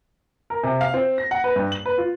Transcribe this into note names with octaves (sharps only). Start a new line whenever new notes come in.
A#4
C3
F5
C4
A#6
F#5
B4
G2
F#7
B4
F4